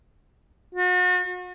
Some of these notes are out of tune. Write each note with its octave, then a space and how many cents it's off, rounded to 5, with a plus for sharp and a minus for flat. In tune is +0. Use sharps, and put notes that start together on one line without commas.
F#4 -40